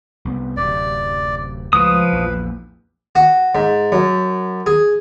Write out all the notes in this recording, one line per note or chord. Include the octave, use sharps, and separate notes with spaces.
C2 B3
D1 F#2 C3 D5
C#2 A2 F3 B4 D#6
A#1 E2
F#4
G#2
F#2
G#4